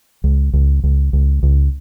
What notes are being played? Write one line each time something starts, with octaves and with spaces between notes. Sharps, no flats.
C#2
C#2
C#2
C#2
C#2